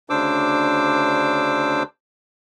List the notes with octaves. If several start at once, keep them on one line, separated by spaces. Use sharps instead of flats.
D2 C#3 D4 C5 D6 E6